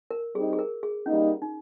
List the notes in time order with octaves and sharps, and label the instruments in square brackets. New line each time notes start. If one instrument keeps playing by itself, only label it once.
[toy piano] A#4
[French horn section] G3 C4 D#4 [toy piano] G#4
[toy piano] G#4
A#4
G#4
[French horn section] G3 A#3 D#4 [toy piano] C#4
[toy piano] D#4